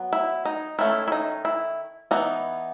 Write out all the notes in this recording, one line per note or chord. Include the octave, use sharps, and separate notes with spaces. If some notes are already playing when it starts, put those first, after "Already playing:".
Already playing: F#3 B3
E4
D#4
D#3 A3 C#4 E4
E4
D#4
E4
E3 B3 D#4